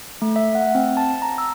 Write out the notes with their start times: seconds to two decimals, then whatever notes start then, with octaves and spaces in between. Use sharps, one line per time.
0.22 A3
0.36 E5
0.55 F#5
0.75 C4
0.97 A5
1.22 A#5
1.38 E6